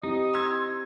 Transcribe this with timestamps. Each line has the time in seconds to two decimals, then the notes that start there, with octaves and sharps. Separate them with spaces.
0.03 C4 D#4 E4 G4 D#5
0.33 C6 E6 G#6